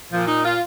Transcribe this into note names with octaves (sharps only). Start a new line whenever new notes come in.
A#2 F3
D#4
F4